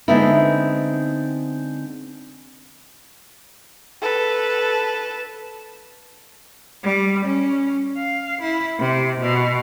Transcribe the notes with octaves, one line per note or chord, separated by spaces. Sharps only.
D3 G#3 B3 C4 D#4 E4
A4 B4
G3
C#4
F5
E4
C3
B2